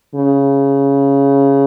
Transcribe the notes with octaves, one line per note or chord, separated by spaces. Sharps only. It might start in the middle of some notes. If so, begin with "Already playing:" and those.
C#3